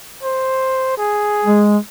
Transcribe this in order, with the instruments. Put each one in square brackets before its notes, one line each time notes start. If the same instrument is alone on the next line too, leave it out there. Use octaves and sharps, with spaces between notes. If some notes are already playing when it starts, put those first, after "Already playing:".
[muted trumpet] C5
G#4
[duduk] G#3